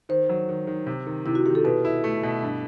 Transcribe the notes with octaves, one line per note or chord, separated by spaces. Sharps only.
D#3 C5
F#3
D#3
D#3
C3
D#3
C3 E4
F#4
D#3 G4
A4
B2 B4
E4
A3
B2
G2